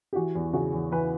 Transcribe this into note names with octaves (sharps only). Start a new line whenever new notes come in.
G4
E3 F#4
E2
C#3 F#4
E2
E3 B4